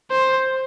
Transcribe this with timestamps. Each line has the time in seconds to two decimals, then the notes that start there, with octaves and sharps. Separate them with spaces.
0.11 C5